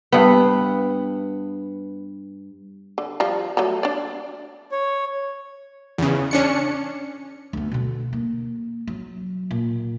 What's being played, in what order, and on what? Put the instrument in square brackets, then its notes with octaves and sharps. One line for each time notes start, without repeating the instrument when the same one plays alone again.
[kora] G2 B3
[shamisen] D3
F3 G3 A#5
F#3 A3 A#5
D4 D5
[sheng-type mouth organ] C#5
[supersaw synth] E2 C#3
C#4 D4 C#7
[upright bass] D2 B3
B2 D3
A#3
F#3
A#2